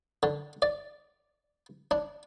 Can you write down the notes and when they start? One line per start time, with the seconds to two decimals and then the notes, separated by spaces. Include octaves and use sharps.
0.23 D3
0.62 D5
1.91 D4